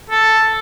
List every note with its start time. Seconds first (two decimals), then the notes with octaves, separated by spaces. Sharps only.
0.10 A4